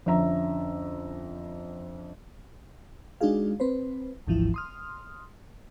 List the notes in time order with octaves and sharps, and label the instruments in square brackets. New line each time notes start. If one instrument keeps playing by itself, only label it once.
[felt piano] F2 D3 C#4 E5 A#5
[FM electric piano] G#3 D4 D#4 F#4 G#4 F5
C4 B4 C5
G#1 D2 G#2 E3 F3 E4
C6 D#6 F6